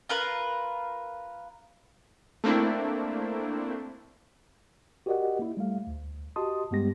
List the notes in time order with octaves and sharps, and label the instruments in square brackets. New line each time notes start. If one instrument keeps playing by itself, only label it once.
[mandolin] F4 A#4 B4
[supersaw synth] A3 A#3 C4 D4 E4
[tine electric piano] F#4 G4 A#4 D5 D#5 F#5
A#3 E4
G3 A3 F5
D2
F#4 G4 D#5 A5 C6 D#6
G2 G3 G#3 B3 G4 A#6